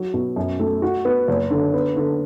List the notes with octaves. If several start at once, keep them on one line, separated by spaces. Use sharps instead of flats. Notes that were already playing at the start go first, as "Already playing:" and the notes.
Already playing: F#3
B2
F#2
A3
F#4
B3
F#1
D3
B3
D3